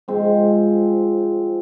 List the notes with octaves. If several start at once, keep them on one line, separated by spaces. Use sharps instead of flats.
G#2 F3 G#3 C4